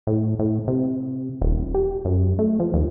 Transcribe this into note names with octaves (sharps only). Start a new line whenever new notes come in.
A2
A2
C3
D#1
G4
F#2
A3
F3
D#2